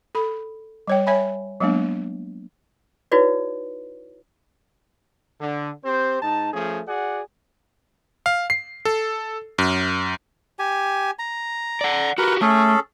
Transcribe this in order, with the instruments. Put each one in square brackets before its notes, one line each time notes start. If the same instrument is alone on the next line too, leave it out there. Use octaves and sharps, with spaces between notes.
[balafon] A4 B5
G3 C#5 G5
C#5 E5 G#5 B5
F#3 G#3 A#3 B3 D4
[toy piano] D#4 E4 F#4 B4 C#5 D5
[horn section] D3
C4 G4 C5
G#2 D#4 A5
F3 A3 C#4 G#4
F#4 G#4 D5 F#5
[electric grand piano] F5
C7
A4
F#2
[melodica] G4 G#5
A#5
[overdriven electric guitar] D5 F#5
[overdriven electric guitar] F#4 G4 [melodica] A#4 B4
[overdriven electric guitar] A3 [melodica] C#4 G#4 A4